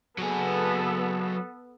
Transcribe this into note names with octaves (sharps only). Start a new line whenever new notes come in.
F#3 B3 G#4 A4